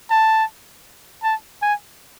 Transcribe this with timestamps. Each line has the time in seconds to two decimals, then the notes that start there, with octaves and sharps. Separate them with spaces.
0.10 A5
1.24 A5
1.62 G#5